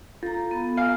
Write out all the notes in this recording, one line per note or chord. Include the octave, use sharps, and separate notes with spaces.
F4 A4 A#5
B3
F5 G#5